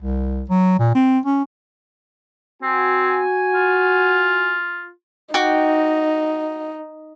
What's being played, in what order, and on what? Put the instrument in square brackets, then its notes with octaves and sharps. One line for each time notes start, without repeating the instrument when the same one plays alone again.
[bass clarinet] C2
F#3
A#2
C4
C#4
[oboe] C4 [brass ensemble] F#4 G#5
[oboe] F4
[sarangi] D#4 [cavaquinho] F#4 G5 D6